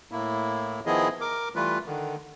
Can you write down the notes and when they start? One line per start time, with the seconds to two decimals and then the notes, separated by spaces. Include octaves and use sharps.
0.12 A2 A#3 E4
0.86 D#3 F3 B3 E4 G#4 D#5
1.21 A#4 D6
1.56 E3 G3 A3 F4 B4
1.86 D3 D#3